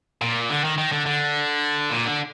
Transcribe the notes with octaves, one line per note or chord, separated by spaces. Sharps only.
A#2
D3
D#3
D#3
D3
D3
A#2
D3